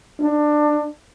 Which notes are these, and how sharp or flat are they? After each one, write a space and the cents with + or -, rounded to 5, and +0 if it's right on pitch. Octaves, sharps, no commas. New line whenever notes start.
D4 +20